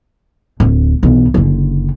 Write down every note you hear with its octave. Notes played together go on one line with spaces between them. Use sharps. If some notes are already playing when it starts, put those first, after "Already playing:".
D1
B1 E3
F#1 D3